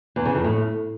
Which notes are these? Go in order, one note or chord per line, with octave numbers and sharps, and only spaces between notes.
E2
C#3
F2
A2